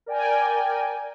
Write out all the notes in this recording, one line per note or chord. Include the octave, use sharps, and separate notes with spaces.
A#4 D5 G5 G#5